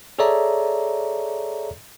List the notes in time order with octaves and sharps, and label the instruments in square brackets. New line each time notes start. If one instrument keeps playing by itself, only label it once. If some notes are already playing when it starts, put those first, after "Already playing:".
[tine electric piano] G#4 A4 C#5 D5 E5 A#5